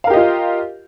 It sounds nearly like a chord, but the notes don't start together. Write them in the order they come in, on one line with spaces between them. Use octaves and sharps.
F5 A#4 G4 D#5 F4